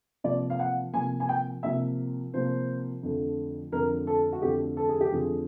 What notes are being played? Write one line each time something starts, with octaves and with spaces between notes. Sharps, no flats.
C3 F3 A#3 D5
F5
F#5
C3 F3 A#3 G#5
G#5
G5
C3 F3 A#3 E5
C3 F3 A#3 C5
F2 D3 F3 A3
F2 D3 F3 A3 A#4
A4
F#4
F2 D3 F3 A3 G4
A4
G#4
G4
F2 D3 F3 A3 G#4